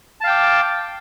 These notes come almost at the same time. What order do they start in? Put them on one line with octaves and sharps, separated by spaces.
A5 F5 G5 D6